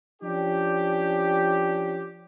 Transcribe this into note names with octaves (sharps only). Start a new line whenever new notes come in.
F3 C#4 D4 G4